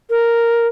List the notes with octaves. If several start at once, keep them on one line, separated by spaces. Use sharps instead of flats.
A#4